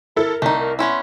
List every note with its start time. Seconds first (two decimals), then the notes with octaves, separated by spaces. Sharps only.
0.16 E4 A4 A#4
0.42 C2 A3 D#4
0.59 A#4
0.79 B3 C#4 E4 C6